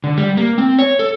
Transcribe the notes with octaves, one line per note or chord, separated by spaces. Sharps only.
D3
G3
A#3
C4
C#5
A4